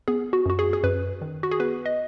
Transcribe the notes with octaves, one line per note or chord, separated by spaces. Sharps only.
B3 G#4
F#4
F#2 F#4
G#4
G#4
F#2 B4
D#3
F#4
G#4
B3 B4
D#5